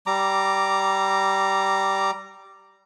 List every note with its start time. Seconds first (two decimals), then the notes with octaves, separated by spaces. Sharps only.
0.06 G3 A#5 D6